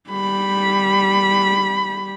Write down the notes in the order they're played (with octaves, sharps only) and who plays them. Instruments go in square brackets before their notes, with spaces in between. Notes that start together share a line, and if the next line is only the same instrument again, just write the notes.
[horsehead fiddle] G3 B5